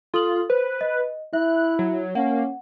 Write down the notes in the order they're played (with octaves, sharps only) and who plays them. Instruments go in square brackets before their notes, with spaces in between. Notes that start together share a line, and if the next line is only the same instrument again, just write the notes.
[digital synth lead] F4 [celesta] A4 D#6 F#7
[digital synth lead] B4 [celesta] C5
[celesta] D#5
[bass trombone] E4 [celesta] E5 [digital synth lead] F#6
[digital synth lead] F#3
[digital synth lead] A#3 [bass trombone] C#4 [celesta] F#5